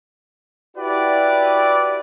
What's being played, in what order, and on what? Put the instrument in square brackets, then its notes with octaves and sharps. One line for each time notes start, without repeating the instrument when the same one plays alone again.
[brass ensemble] E4 F#4 G4 B4 D5